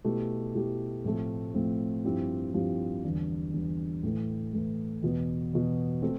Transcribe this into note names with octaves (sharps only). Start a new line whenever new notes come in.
B2 A3 E4 G4
B2 A3 E4 G4
A2 F3 A3 C4
A2 F3 A3 C4
G2 F3 C4 E4 G4
G2 F3 C4 E4 G4
E2 D3 G3
E2 D3 G3
A2 E3 A3
A2 E3 A3
E2 B2 B3
E2 B2 B3
A3 C4